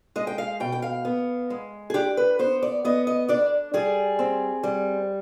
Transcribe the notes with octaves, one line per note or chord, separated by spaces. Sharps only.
G#3 D#5
G5
F5
B2 G5
G5
F5
B3
G#3
G#4
D4 G4
B4
B3 C5
D5
B3 D#5
D#5
D4 D5
G3 G#4
C4
G3